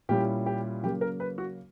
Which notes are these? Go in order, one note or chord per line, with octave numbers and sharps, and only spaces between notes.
A#2 G3 C#4 E4 G4
G4
C#3 F#3 A#3 G4
A#4
B4
F#4